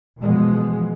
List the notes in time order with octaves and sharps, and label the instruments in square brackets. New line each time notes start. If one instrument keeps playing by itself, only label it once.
[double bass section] B2 E3 F3 G#3